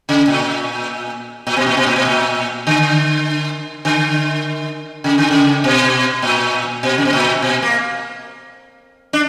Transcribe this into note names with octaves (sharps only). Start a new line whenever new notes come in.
C#3
A#2
A#2
B2
A#2
B2
A#2
B2
A#2
D3
D3
C#3
D3
C#3
B2
A#2
B2
C#3
B2
A#2
B2
A#3
D4